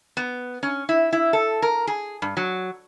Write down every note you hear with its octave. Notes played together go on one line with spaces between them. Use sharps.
B3
C#4
E4
E4
A4
A#4
G#4
G2
F#3